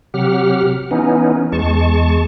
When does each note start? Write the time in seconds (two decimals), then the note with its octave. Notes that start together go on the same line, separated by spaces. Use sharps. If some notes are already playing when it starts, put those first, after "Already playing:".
0.14 C3 F#3 G4 F#5 F6
0.91 E3 B3 C#4 D#4
1.52 E2 G#3 A5 C#6